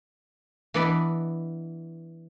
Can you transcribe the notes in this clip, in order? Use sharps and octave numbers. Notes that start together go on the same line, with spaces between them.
E3 B3 D4 D5 D#5 B5